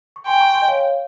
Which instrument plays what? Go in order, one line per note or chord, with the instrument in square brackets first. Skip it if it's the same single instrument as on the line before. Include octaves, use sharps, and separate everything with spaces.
[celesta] C#6
[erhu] G5 [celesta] G#5 C6
[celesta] A#5 C#6
G#5 C6
D#5
C#5 F5